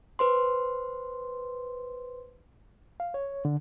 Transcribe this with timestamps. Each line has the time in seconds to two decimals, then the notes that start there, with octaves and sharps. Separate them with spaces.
0.19 B4 C5 C6
3.00 F5
3.14 C#5
3.45 D3